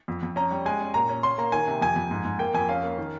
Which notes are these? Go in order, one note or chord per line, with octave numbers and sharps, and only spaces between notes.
F2
F2
C#4 A#5
G3
G#3 G#5
C#4
A#2 A#5
C#4
C#4 C6
A#3 A#5
D#3 G#5
C3
F2 G#5
F2
G#2
G#2
A#3 G5
F2 G#5
C#4 F5
A#3
D#3